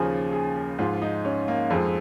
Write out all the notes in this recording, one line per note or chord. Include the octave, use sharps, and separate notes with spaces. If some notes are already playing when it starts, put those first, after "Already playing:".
Already playing: D#2 C#3 F3 G#4
G#4
G#2 F3 F4
D#4
C#4
A#3
F2 F3 G#3